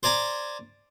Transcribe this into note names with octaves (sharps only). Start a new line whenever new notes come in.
C5 D5 G#5 A#5 D6